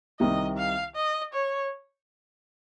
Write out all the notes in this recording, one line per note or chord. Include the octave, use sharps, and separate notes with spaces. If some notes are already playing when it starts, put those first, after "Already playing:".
C2 C3 D#3 D#5
F5
D#5
C#5